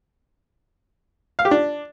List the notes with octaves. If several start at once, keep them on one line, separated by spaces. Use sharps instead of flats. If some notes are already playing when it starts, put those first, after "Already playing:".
F5
G4
D4